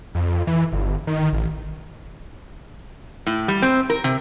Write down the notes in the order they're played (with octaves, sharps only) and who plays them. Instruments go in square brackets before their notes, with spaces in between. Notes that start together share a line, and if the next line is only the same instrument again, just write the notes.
[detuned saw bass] F2
E3
G1
D#3
A1
[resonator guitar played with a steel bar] A2
G3
C4
A#4
C3